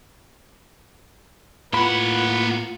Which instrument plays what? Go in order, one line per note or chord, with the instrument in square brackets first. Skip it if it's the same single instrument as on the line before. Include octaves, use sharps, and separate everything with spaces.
[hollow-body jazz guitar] A2 B5 [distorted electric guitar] A#3 F#5 [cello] F4 [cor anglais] B4